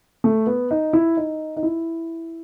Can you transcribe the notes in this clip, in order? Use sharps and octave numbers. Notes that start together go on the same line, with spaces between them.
A3
B3
D#4
E4
D#4
D#4
E4